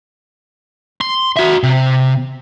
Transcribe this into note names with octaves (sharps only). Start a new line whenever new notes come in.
C6
F#4 E5
C3